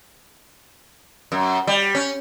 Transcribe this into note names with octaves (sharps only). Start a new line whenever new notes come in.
F#2
G3
C#4